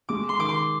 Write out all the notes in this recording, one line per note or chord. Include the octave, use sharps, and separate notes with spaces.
G#3 D6
C6
D#3 D6
C6